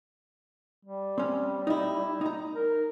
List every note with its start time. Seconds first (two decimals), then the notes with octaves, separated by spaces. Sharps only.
0.85 G3
1.18 C4 C#4
1.67 D#4 E4
2.21 D#4 A#5
2.55 A#4